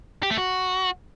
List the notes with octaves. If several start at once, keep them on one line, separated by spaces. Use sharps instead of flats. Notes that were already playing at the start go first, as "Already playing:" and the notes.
G4
A3
F#4